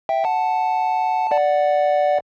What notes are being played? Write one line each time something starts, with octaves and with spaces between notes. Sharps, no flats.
E5 G5
F#5 A5
D5 F#5